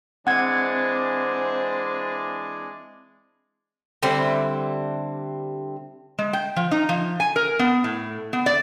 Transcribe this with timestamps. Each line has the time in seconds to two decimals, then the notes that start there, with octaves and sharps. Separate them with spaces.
0.27 E3 G#3 C4 D4 C5 F#5 G#6
4.03 D3 G3 C4 E4
6.19 G#3
6.33 G5
6.56 F3
6.71 D#4
6.89 F3
7.20 G#5
7.36 A#4
7.59 B3
7.84 A2
8.33 B3
8.46 D5